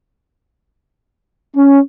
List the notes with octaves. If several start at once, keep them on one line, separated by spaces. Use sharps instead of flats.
C#4